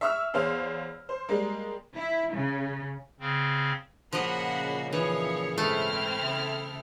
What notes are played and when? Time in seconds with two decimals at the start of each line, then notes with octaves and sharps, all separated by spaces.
0.01 E5 C#6 E6 F6
0.34 E2 C5 C#5 F5 F6
1.09 C5
1.29 G3 G#3 A#3
1.96 E4
2.34 C#3
3.20 C#3 C4
4.13 A#2 C#3 F3 A#3 F#4 D#5 F#5 B5
4.93 E3 F3 D#4 E4 C#5
5.58 G#2 A3 C4 E4 F6
6.23 C#3 A4